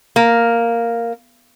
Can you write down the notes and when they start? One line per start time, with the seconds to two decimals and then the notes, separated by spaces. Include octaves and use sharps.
0.16 A#3